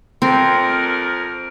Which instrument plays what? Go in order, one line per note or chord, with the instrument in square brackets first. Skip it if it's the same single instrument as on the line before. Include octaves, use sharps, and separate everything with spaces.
[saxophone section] F2 A#4 [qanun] C4